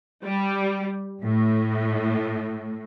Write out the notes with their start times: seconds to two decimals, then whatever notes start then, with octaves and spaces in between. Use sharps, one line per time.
0.24 G3
1.23 A2